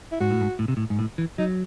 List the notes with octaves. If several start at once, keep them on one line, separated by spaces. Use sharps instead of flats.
E4
G#2 F#4
A2
G#2
A2
C3
A2
G#2
A2
E3
F#3 D#4